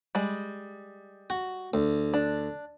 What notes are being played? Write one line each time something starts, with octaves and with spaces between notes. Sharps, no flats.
G3 G#3
F#4
D2
D4